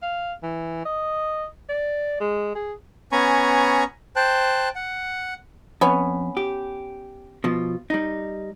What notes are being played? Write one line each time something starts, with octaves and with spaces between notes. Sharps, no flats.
F5
E3
D#5
D5
G#3
G#4
B3 C#4 G#5 A#5 B5 C#6
C5 G5 A5 F#6
F#5
F2 B3 C#4
G4
B2 F3 F4
G3 D#4